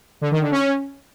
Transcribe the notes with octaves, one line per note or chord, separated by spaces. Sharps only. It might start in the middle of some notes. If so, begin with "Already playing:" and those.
D3
D#3
D3
C#4